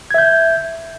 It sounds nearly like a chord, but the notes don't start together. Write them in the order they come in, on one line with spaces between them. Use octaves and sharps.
G#6 E5 G6